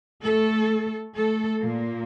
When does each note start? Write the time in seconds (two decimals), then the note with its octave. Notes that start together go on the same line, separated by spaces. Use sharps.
0.22 A3 A4
1.15 A3 A4
1.61 A#2 A#3